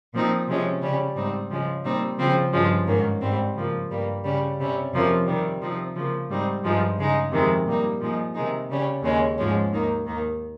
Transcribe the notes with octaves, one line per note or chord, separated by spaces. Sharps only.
A#2 F3 C4 D#4
C3 F3 G#3 C#4
C#3 G3 C#4
G#2 G3 C4 D#4
C#3 F3 G#3 C#4
A#2 G3 C4 D#4
C#3 F3 C4
G2 F3 G#3 C#4
G#2 D#3 A#3 C#4
G#2 G3 C4
C#3 F3 A#3
G2 G3 A#3
C#3 G3 C#4
C3 G3 C#4
F2 C3 F3 A#3 C#4
C3 D#3 G3
C3 F3 C4 D#4
C#3 F3 A#3
G#2 G3 C4 D#4
G2 F3 G#3 D#4
C#3 G#3 D#4
F2 C3 D#3 G#3
A#2 G3 A#3 D#4
A#2 F3 G#3 D#4
C3 D#3 G#3 D#4
C#3 G3 C#4
D#2 C#3 G#3 C#4
G#2 F3 G#3 C#4
D#2 D#3 A#3 D#4
D#2 D#3 A#3 D#4